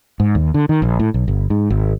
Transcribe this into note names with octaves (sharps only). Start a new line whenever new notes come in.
G#2
D#2
D3
D#3
A#1
A2
B1
G1
G#2
G#1